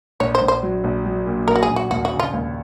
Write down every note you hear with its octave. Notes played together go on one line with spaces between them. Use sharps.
A#1 C#5
C5
A#1
C5
F#3
A#1
F#3
A#2
A#1 A#4
F#4
G#4
A#1
F#4
D#2 F#4
F#4
C#3
F4
D#2